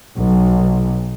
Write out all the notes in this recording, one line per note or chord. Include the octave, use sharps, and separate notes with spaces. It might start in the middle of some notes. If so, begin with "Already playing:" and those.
B1